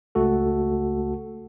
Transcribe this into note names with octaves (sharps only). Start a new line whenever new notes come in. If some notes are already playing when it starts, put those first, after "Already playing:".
C#2 A3 F#4 A4